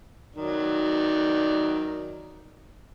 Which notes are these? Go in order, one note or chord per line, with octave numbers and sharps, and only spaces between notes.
D#3 F#3 D5